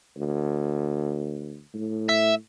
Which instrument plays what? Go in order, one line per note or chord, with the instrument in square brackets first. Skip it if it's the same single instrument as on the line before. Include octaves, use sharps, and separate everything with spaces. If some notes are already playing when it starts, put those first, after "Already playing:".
[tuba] D2
A2
[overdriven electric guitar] E5